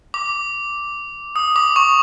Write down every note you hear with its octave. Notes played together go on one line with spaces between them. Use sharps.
D6
D#6
D6
C#6